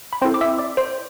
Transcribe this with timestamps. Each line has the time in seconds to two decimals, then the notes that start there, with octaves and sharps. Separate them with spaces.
0.13 B5
0.21 C4 E4 A4 C5 C6
0.34 D6
0.41 E5 E6
0.58 D5 D6
0.77 C5 C6